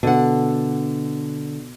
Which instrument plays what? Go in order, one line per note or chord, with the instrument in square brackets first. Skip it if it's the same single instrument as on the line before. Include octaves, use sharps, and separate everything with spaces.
[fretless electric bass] B2 [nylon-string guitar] D3 F#5